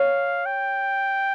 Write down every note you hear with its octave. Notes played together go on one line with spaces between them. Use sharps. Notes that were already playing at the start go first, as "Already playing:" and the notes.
Already playing: C#5 F5
G5